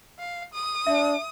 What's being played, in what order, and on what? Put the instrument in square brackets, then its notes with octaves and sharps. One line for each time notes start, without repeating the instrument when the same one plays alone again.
[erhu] F5
D#6
[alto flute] D4 [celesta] E5